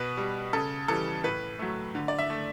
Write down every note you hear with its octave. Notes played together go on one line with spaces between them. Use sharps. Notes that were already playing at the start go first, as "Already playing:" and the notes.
Already playing: B2 B4
G3
C#3 A4
E3 G3 A4
A2 B4
F#3 A3
D3
D5
E5
A3